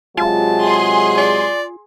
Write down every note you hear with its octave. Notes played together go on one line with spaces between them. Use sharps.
C3 F#3 G#3 F4 A5
G#4 C6
D5